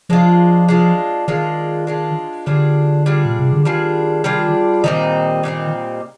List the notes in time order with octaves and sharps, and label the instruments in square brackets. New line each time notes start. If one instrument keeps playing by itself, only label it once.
[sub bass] F3 [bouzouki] G#3 D4 F4
[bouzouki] G#3 D4 F4
[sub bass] D#3 [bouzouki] G#3 D4 F4
[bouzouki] G#3 D4 F4
[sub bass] D3 [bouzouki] G3 D4 F4 G#4
[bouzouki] G3 D4 F4 G#4
[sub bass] A#2
C3
D3
[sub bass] D#3 [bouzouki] G3 D4 F4 G#4
[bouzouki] G3 D4 F4 G#4
[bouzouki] A#2 G3 C4 D#4 [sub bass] D#3
[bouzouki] A#2 G3 C4 D#4